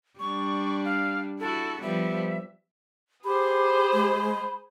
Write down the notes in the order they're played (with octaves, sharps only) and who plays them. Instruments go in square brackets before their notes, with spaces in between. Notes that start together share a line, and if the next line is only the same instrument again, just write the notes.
[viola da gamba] G3 D4 [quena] C#6
[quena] F5
[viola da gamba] E4 F#4 [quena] A4
[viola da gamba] F3 G3 B3 [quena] E5
[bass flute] G4 [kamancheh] G#4 C5 [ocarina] B5
[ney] G#3